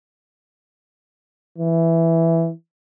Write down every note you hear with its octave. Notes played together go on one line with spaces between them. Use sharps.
E3